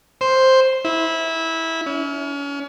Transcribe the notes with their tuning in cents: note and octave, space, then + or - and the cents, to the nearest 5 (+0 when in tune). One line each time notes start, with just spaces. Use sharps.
C5 +0
E4 -15
C#4 +35